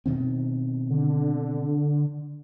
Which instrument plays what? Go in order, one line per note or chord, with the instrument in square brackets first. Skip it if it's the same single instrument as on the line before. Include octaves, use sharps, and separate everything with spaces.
[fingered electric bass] B2 D#3 C4
[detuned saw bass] D3